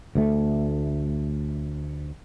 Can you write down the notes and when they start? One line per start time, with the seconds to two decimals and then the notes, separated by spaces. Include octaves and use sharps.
0.15 D2 A3